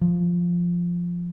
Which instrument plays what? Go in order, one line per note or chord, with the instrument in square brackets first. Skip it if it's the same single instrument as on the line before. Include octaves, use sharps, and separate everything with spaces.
[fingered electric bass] F3